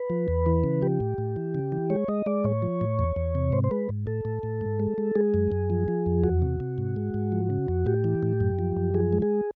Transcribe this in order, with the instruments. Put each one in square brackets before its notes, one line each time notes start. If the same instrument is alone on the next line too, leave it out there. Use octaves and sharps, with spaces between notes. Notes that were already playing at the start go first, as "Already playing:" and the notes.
Already playing: [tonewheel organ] B4
F3
E2
E3
C#3
F3 G4
A2
A2
E3
C#3
E3
G#3 C#5
G#3 D#5
G#3 D5
A2 C#5
F3
A2
E2
E2
C3
G#2 C5
C5
G#3 B4
G#2
A2 A4
A2
A2
G#2
G#3
G#3
G#3 G#4
F#2
F#2
F3
F3
F2
E2 F#4
C3
C3
G#2
G#3
G#2
F3
C#3
F2
A2 G4
E3
A2
F#2
F3
F#2
F3 G#4
G#3
G#4